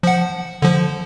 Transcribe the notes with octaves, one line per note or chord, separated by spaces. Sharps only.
F3 F#5
D3 F3